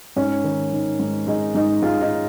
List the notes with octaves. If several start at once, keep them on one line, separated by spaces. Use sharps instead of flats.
G#2 C#4
D#3
D#3
G#2
G#3 D#4
G#2 D#4
G#3 F4
D#4